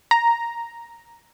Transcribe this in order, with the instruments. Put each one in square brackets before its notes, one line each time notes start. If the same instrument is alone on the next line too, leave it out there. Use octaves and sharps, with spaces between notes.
[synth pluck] A#5